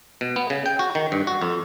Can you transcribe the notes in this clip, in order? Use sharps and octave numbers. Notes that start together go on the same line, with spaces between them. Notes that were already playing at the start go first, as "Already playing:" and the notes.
B2
B3
C#3
G5
F#4
D#3
G2
F#4
F2